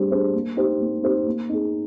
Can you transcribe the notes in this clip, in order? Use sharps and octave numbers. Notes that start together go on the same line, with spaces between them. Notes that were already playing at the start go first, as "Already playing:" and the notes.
Already playing: G3 D4 G#4 C5
D4 G#4 C5
A#3
D#4 G4 C5
A#3
D#4 G4 C5
A#3
D#4 G#4